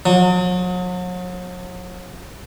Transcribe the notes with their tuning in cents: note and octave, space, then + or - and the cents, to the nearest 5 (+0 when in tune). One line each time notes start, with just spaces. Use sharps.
F#3 -40